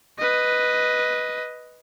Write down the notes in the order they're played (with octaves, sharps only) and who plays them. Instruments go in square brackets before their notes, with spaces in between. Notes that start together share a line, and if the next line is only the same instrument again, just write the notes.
[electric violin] B4 D#5